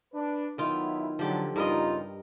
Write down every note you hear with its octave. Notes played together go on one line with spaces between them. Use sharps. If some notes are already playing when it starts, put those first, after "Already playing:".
D4 B4
D#3 F#3 B3 E4 F4
D3 F3 F#3 G4
E2 G2 C#3 D#4 F4 A#4 D#5